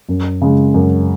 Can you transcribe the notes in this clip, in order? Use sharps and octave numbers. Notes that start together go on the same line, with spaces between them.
F#2
C#3 G#3
F#2